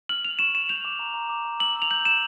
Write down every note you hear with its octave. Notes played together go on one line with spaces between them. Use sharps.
F6 F#7
F6 F7
C#6 E7
C#6 E7
G6 F7
D6
A#5
A#5
D6
A#5
E6 F#7
E6
F7
G6 F#7
G6 E7